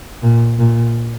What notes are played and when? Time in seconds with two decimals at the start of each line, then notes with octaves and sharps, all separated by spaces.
0.23 A#2
0.59 A#2